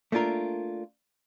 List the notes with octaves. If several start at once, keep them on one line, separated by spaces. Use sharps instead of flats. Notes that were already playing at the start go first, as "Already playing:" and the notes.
A3 A#3 D4 F4 A#4